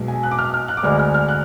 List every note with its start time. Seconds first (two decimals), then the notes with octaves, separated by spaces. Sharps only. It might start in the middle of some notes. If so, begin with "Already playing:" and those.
Already playing: B1 B2 G#3
0.08 G#5
0.23 F#6
0.31 D6
0.38 F6
0.54 F6
0.68 F#6
0.77 D6
0.83 D2 D3 G#3 F6
0.99 F6
1.14 F6
1.29 F#6